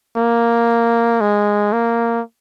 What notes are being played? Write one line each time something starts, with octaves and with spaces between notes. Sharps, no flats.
A#3
G#3
A#3